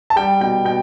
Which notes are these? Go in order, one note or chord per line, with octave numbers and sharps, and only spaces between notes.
A5
G3 G5
B2 G5
B2 G5